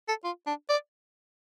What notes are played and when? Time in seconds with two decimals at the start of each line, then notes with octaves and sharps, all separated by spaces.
0.08 A4
0.24 F4
0.46 D4
0.69 D5